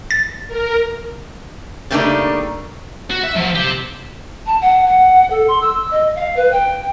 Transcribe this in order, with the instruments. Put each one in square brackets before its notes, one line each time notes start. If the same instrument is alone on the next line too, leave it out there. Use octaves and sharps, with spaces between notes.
[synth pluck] A6
[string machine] A#4
[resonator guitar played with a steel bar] C#3 G3 A3 A#3 D4 D#4
[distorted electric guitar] F#4
E5
F3 F#3
G4 C5
[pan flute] A5
F#5
F#5
A4
C6
E6
D#5
F5
B4
G5